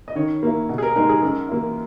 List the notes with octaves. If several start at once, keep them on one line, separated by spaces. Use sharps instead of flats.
D#5
D#3 C#5
A#3 E4
B2
G#4
A#4
G#3 D#4 A#4
G#4
F#2 A#4
E3 A#3 E4